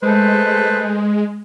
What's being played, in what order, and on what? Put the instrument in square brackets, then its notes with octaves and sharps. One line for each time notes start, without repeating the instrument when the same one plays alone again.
[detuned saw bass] G#3 [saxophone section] A3 B4 C5